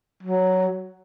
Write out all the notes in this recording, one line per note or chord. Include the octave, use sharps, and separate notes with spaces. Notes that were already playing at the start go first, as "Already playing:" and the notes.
F#3